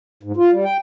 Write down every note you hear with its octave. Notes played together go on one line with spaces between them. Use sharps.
G#2
F4
G3
G5